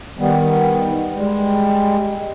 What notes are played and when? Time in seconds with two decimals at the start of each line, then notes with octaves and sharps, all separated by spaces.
0.19 D#3 G3 B3
1.16 G3 G#3